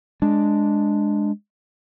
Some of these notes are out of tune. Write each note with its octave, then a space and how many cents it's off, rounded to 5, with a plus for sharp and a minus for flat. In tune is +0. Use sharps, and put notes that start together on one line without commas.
G#3 +0 D4 +0